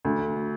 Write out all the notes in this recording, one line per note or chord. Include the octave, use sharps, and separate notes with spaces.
D2